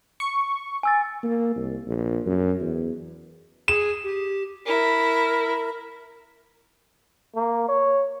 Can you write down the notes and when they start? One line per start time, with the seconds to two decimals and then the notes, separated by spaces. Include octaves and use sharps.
0.20 C#6
0.83 G#5 E6 A6
1.23 A#3
1.56 C2
1.87 A#1
2.26 F#2
2.60 E2
3.68 G#4 E7
4.04 G4
4.66 E4 A#4
7.36 A#3
7.68 C#5